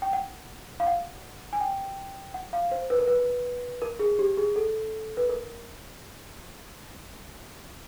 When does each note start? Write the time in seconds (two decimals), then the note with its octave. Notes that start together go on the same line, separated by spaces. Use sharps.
0.02 G5
0.13 F#5
0.80 F5
0.87 F#5
1.53 G#5
1.61 G5
2.34 F#5
2.53 F5
2.71 C5
2.90 B4
2.99 A#4
3.07 B4
3.82 A#4
3.99 G#4
4.19 G4
4.37 G#4
4.56 A4
5.17 B4
5.29 A#4